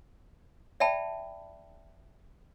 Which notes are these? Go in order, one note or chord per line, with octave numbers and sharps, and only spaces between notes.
D5 E5 G5 A5 B5